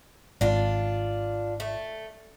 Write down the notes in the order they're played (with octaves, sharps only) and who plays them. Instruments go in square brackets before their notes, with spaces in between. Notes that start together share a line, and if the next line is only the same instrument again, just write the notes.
[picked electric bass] G#1 [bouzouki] D4 F4
[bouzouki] A3